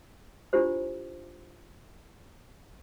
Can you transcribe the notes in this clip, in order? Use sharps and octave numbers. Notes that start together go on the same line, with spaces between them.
D4 E4 F4 G4 C5